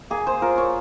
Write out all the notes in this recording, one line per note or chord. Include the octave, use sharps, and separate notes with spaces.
A#3 G#4
C5
F4 A#4
C#5